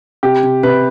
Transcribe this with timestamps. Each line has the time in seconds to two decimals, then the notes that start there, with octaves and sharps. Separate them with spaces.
0.23 C3 G4
0.43 C3
0.63 C3 B4